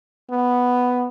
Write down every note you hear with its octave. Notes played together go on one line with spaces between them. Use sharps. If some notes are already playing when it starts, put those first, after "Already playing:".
B3